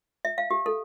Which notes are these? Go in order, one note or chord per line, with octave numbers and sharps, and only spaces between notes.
E5
F5
G4
A4